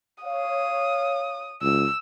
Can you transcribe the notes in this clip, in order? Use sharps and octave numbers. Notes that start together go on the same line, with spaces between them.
C#5 F5 D#6
C#2 E6